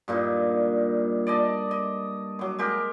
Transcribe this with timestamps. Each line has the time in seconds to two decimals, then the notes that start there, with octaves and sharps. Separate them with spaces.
0.08 G2 A#2 D#4
1.27 D5 D#5 A5
1.71 D#5
2.39 F#3 D6
2.59 G#3 G4 A#4